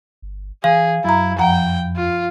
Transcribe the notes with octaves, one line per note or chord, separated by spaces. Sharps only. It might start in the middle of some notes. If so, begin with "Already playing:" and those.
G1
E3 G#4 F5
F#2 F#3 E4 A#5
F2 F3 F#5 G5 A#5
F4